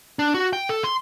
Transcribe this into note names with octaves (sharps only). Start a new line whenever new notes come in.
D4
F#4
G5
A4
C6